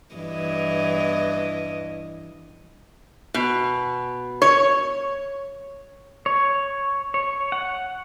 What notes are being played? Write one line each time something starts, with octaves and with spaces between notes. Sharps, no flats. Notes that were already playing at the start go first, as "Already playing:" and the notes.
G2 E3 D#5
B2
C#5
C#5
C#5
F#5